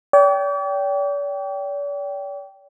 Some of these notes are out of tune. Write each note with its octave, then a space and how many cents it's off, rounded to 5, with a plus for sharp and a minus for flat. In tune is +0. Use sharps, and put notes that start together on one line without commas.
D5 -45 G5 -10